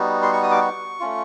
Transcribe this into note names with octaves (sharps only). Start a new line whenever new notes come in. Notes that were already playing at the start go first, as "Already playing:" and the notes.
Already playing: G3 B3 D#4 F#4
C6
C#6
D#6
D6
C#6
A3 C#4 F4